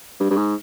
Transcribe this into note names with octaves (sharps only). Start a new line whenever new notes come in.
G2
G2
G#2